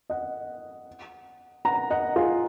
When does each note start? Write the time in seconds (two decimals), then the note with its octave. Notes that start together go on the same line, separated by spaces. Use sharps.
0.10 D#5 F#5
1.65 F#5 A#5
1.90 D#5 F#5
2.16 F4 G#4